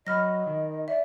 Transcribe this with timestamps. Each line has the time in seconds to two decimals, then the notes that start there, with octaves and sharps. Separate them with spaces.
0.07 F#3 D#5 B5 F6 A#6
0.47 D#3
0.88 D5 E5